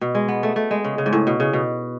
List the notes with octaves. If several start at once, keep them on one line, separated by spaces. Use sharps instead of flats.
B2
G#3
B3
A3
A3
G#3
C#3
C#3
G#2
A2
B2
C#3
B2